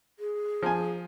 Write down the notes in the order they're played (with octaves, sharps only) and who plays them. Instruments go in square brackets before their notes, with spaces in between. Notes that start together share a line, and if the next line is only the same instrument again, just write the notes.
[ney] G#4
[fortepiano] F3 G#5